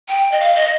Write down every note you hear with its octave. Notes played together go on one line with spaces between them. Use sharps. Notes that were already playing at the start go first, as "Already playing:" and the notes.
G5
D#5
F5
D#5